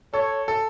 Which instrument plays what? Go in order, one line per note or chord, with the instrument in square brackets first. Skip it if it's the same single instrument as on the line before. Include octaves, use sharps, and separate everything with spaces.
[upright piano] A4 [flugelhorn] C#5
[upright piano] A4